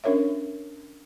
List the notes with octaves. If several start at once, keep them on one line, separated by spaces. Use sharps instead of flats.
C#4 D4 A#4 C#5 E5